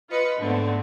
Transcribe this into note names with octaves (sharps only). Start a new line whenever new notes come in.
F4 B4 D#5 C#7
G#2 D3 A3 B3 C4